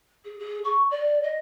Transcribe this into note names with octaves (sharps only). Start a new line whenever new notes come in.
G#4
G#4
C#6
D5
D#5